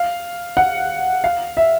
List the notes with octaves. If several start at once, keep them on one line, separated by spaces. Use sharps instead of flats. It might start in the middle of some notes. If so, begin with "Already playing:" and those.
Already playing: F5
F#5
F5
E5